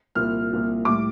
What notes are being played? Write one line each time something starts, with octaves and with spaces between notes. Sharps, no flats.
C2 A#2 F3 F6
C2 A#2 F3
A2 G3 D6